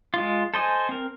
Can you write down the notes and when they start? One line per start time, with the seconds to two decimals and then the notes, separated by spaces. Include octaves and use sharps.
0.14 G#3 F4
0.54 A4 C5 D#5 G#5
0.89 C4 A#4